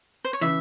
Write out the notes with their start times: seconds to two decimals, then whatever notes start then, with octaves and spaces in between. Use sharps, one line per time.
0.25 C5
0.33 C#5
0.41 C#3 E3 E5